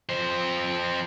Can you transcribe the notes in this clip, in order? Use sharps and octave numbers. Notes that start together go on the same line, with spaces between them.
F2 C5